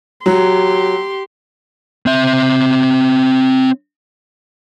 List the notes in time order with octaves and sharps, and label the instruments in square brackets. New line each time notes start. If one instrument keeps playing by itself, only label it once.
[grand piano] F#3 [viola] G4 C6
[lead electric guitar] C4 E5